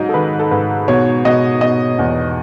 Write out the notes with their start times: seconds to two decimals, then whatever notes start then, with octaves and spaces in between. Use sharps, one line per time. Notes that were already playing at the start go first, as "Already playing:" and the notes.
Already playing: G#2 F#3 D#5
0.09 A4
0.14 D#3 B4
0.39 A4
0.51 G#2 B4
0.88 B2 C#5
1.25 B2 D#5
1.61 B2 D#5
1.99 E2